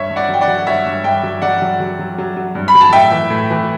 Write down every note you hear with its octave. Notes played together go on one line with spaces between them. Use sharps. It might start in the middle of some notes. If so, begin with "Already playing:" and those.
Already playing: G2 C#5 E5
G2
D5 F#5
F#3 G5
D5 F#5
F#3
G2 C#5 E5
G2
G2 E5 G5
F#3
F#3 D5 F#5
F#3
F#3
F#3
F#3
F#3
G2
B5
F#3
A5
A2 E5 G5
E3
A2
E3